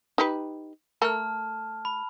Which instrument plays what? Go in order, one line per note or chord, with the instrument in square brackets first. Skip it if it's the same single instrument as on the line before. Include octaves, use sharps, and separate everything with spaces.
[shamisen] D#4 G4 B4
[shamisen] A3 A4 A#4 [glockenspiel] A5 F6
[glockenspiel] B5